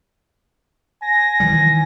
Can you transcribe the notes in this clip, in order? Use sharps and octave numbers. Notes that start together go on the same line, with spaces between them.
G#5 A#6
D#3 E3 G3